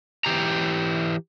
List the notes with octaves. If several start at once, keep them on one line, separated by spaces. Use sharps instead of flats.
E3 G4 A#5